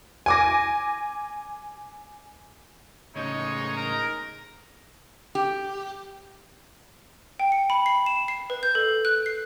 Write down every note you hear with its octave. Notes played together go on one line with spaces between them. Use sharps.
G#5 D6 A#6
A2 C#3 G#3 D#4 C#5
A#4 A#5
G4
G5
C#7
B5
C7
E7
C7
B4
G6
A4
F#6
C7